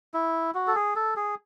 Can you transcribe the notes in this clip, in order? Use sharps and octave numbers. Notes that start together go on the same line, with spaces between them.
E4
F#4
A4
G#4
A4
G#4